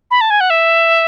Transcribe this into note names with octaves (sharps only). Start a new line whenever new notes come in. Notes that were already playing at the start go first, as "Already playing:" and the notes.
B5
A5
G#5
F#5
E5